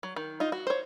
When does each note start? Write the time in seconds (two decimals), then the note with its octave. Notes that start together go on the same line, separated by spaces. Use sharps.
0.03 F#3
0.16 D#3
0.40 D#4 F4
0.52 F#4
0.67 C5 C#5